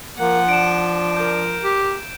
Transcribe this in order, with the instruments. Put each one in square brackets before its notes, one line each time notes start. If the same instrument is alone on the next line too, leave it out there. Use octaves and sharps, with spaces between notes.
[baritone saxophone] F3 [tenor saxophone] A#3 [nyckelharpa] F#5
[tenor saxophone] D4 [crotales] D7 E7
[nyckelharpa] A#4 [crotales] G6
[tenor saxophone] G4